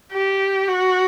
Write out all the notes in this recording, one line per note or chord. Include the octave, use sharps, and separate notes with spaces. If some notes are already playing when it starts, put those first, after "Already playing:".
G4
F#4